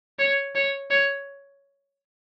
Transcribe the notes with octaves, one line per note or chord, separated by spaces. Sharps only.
C#5
C#5
C#5